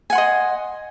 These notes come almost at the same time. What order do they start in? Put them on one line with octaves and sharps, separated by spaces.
G#5 F#5 C6 D#5